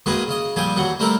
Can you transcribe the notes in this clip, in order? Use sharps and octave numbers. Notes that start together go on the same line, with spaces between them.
F#2 D#3 G#3 A#3 G#4 B4
C#3 D#5
A#2 F3 G3 G4 G#5
D#2 E3 F#3 F#5
G3 A3 C4 E4 A#4 A#5